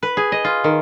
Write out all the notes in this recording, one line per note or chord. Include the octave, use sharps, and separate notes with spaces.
B4
G#4
D#5
F4
D#3